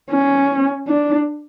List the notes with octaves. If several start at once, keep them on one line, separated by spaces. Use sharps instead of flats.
C#4
D4